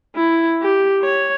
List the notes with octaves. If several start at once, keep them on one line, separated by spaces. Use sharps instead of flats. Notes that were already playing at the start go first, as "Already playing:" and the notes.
E4
G4
C#5